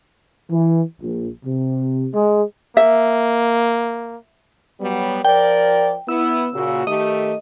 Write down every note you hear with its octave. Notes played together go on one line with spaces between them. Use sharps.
E3
A#1
C3
G#3
A#3 E5
F#3 G3 B3
F3 A#4 D5 G5
B3 E4 E6
A#2 C#3 F#4
D#3 A3 G4 D#5